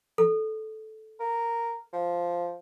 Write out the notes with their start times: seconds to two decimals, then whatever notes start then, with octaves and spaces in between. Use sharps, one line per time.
0.18 A4
1.20 A#4
1.93 F3